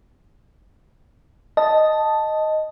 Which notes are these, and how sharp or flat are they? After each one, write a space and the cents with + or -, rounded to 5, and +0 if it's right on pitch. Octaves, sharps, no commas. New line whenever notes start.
D#5 +0 A5 +0